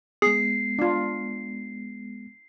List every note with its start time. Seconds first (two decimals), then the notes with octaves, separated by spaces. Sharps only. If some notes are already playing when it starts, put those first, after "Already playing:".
0.22 G#3 B3 G#4 C7
0.79 D4 F4